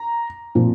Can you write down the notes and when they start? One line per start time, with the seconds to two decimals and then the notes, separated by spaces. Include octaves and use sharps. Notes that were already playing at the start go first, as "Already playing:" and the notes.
Already playing: A#5
0.55 A#2 F3 C4